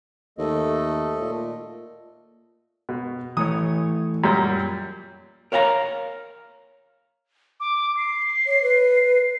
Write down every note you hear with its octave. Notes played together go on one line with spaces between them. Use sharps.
D#2 A3 A4 D#5
A#2
B2
E3 A3 C#5 D#6
F#2 A#2 G3
A#4 C#5 F5 F#5 A#5
D6
C7
C#5
B4